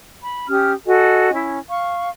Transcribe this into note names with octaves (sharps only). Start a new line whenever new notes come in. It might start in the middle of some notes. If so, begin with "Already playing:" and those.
B5
C#4 G4 D#6 F6
F#4 A4 D#5 G#5
C#4 E4
F5 C#6